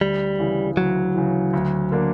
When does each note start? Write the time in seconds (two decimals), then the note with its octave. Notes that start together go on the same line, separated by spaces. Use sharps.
0.01 D2 G3
0.39 C#3 E3
0.76 D2 F#3
1.14 C#3 E3
1.53 D2
1.91 D3 A#3 D4